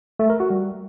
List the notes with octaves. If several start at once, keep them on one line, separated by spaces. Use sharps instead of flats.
A3
A#4
F#4
G3